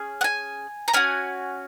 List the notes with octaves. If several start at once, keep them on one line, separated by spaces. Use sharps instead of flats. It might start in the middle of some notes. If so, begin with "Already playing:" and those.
Already playing: C#4 G#4
F#5
G#5
A#5
C#4 F#4 G#5